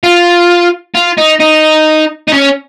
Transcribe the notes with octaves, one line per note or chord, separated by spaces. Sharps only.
F4
F4
D#4
D#4
D#4
C#4